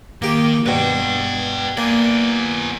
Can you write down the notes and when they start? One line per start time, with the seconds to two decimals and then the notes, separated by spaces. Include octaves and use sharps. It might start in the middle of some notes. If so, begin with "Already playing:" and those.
0.22 D#3 A#3 G4
0.66 G2 B2 B4 G5
1.77 A#3 B3 D5